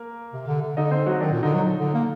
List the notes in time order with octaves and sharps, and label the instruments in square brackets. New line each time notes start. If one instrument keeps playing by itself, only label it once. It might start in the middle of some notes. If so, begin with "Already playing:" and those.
Already playing: [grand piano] A#3 A#4
[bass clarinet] C3
D3
D3
[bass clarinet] D3 [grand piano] D#4 D#5
[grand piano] C4 C5
F#3 F#4
[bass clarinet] D#3 [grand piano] D4
[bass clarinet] A#2
[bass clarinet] D3 [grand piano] D#4
[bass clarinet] F#3
D3
A#3